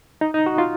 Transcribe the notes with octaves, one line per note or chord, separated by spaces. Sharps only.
D#4
D#4
F#4
F4